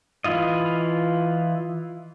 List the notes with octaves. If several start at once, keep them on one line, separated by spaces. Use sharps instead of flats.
E3 E4 F4 D#5